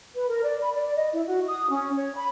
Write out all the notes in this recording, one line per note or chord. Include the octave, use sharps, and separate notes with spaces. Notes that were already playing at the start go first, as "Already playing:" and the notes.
B4
A#4
D5
B5
D5
D#5
E4
F#4
D#6
C#4
C#5
B5